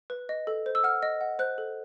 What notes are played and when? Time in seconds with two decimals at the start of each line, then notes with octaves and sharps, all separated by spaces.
0.10 B4
0.29 D#5
0.47 A4
0.66 C5
0.75 E6
0.84 F#5 F6
1.03 D#5
1.21 F#5
1.39 C5 F#6
1.58 A4